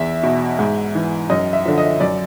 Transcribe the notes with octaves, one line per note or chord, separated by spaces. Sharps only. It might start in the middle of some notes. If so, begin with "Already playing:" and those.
Already playing: E2 E5
B2
G#2
E3
F#2 D#5
E5
D3 F3
D#5
F#2 D5